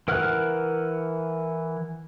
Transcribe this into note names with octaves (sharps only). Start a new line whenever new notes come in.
E3 A#4 F#5 F6 F#6